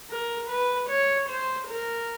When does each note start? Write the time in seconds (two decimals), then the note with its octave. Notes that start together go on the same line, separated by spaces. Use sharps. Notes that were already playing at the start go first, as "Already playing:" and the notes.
0.10 A#4
0.49 B4
0.89 C#5
1.29 C5
1.68 A#4